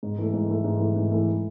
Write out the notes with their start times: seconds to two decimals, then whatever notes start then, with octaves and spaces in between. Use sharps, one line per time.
0.03 G#2
0.18 E3 A3
0.33 G#2
0.50 E3 A3
0.64 G#2
0.80 E3 A3
0.96 G#2
1.11 E3 A3